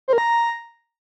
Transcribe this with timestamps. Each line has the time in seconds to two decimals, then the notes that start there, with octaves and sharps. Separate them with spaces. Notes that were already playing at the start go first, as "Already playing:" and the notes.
0.08 C5
0.13 A#4
0.18 A#5